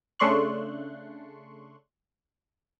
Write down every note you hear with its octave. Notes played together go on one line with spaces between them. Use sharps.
C#3 A3 D4 C6 C#6 F#6